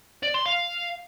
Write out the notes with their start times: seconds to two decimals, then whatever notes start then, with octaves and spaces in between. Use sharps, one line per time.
0.23 D5
0.34 C6
0.46 F5